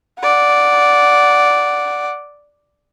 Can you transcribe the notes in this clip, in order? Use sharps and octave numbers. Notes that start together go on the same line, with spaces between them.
D5 F#5